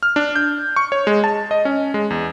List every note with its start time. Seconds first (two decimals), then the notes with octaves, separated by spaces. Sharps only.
0.03 F6
0.16 D4
0.36 G6
0.76 C#6
0.92 C#5
1.07 G#3
1.24 A5
1.51 D#5
1.65 C#4
1.94 G#3
2.10 E2